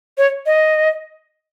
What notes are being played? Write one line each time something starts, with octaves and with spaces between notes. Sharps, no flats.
C#5
D#5